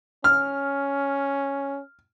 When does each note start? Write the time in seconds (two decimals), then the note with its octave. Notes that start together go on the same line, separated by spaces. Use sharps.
0.24 C#4 F6